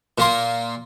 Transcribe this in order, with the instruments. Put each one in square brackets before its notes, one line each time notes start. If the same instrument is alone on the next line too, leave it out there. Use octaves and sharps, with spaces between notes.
[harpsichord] A#2 A#3 C6